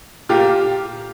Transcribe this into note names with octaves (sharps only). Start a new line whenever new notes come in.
A#2 F4 G4